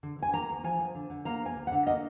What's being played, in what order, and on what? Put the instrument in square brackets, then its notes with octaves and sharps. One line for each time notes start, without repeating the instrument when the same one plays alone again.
[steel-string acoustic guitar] D3
D2 G#5
A#3 A#5
D2
F3 G#5
F3
D3
D3
A#3 A#5
F3
G#5
D2
F#5
D3
A#3 D#5